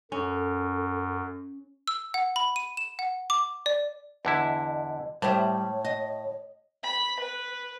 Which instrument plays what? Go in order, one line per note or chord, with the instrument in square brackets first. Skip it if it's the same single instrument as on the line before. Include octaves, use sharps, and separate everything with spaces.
[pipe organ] F#2 [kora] C#4 [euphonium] A4
[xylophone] E6
F#5
B5
D#7
E7
F#5
D6
D5
[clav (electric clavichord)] E2 D3 E4 [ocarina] D#5
[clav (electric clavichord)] A2 [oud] G3 C5 E5 [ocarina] C#5
[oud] D#5
[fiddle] B5
B4